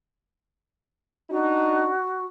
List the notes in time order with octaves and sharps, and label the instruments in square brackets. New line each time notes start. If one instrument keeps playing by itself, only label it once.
[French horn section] D4 D#4 [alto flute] F#4